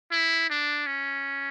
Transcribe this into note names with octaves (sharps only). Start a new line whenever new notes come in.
E4
D4
C#4